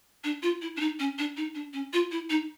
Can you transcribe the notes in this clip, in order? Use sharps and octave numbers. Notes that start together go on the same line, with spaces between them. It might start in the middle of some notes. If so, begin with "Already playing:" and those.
D4
F4
E4
D4
D#4
C#4
D4
D#4
D4
C#4
F4
E4
D#4